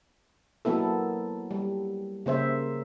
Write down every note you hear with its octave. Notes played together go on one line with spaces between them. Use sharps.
F#3 A#3 B3 E4 A4
G3
C#3 A#3 C5 E5